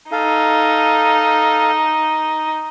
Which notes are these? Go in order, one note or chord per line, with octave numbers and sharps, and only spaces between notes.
D#4 A4 F5